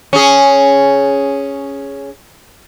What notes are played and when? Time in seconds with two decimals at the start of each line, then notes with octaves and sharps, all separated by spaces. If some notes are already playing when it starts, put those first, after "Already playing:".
0.13 C#4 G#4